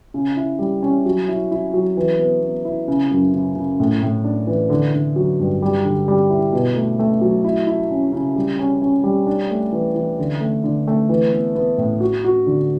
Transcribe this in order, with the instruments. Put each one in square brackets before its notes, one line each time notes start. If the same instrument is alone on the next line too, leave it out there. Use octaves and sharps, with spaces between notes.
[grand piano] C#3
E4
G3
C#4
F#3
E4
E4
F#3
E3
B3
B3
E4
C#3
F#2
C#3
C#3
A2
A2
D4
E3
D3
D3
F#3
G2
G3
D3
G3
E4
B2
A3
A3
F#3
E4
E4
C#4
C#3
G3
C#4
C#4
G3
D4
A3
E3
E3
D3
A3
D3
A3
E3
B3
B3
A2
F#4
F#4
D3